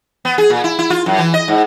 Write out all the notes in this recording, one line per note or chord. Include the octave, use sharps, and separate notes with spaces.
B3
G#4
A#2
E4
E4
F4
F#2
E3
D#5
G#2